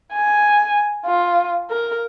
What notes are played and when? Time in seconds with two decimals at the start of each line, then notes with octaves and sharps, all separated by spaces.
0.13 G#5
1.06 F4
1.70 A#4